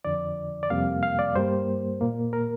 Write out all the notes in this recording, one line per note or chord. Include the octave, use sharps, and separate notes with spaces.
F2 D3 F3 D5
D5
F2 C3 G3 A#3 F5
F5
D5
G2 G3 A#3 C5
A#2 A#3
A#4